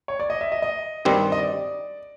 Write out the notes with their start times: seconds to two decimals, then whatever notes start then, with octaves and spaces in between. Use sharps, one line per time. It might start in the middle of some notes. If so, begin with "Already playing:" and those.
0.08 C#5
0.20 D5
0.30 D#5
0.41 E5
0.52 D#5
0.62 D#5
1.05 G2 D#3 G3 C4
1.32 D#5
1.38 D5